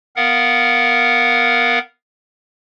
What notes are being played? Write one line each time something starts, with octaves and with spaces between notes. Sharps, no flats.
B3 A#4 F5 F#5